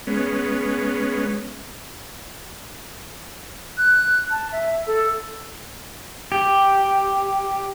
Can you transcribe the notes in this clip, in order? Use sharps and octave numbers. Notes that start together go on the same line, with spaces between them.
G#3 B3 C#4
F#6
A5
E5
A4
G4